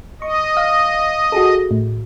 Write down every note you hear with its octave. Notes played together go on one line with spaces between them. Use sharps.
D#5 C#6
F5 D#6
F#4 G#4 A4
A2